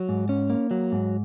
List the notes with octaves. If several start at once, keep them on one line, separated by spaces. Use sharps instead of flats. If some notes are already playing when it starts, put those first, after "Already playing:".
Already playing: F#3
G#2
C#4
A#3
F#3
G#2